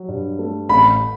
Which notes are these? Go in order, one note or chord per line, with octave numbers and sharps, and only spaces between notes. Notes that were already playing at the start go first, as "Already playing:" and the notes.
Already playing: F#3
G2
A3
A1 B5